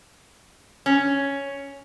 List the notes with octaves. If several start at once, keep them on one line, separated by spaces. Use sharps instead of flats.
C#4